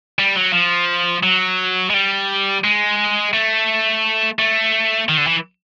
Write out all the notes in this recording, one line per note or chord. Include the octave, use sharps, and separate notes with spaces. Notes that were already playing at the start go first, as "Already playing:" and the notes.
G3
F#3
F3
F#3
G#3
G3
G#3
A3
A3
D#3
D3
E3